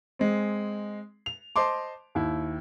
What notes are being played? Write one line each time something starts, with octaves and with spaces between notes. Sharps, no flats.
G#3 C4
F7
C5 D#5 A5 C6 D6
D#2 E4